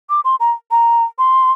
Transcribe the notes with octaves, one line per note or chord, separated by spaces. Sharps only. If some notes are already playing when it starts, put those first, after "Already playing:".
D6
C6
A#5
A#5
C6